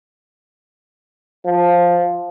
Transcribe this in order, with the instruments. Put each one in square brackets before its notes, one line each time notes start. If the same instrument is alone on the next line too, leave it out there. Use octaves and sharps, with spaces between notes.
[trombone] F3